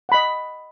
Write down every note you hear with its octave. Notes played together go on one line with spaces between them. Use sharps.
D#5 F#5 B5